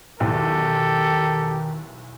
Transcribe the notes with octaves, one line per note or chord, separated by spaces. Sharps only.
B1 E2 D#3 G4 A4